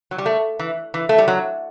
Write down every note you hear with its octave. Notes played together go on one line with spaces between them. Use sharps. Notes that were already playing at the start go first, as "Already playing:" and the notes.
F#3
G3
A3
E3
E3
A3
G3
F#3